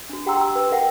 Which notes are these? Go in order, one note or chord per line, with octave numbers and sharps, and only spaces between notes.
D4 F#4
G4 F#5 G5 A#5 C6 E6
E6
B4
A#4 E5 F#5 G5